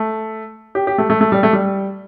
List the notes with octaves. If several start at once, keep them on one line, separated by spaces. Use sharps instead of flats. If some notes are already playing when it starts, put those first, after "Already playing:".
Already playing: A3
G4
G4
A3
A3
A3
G3
A3
G3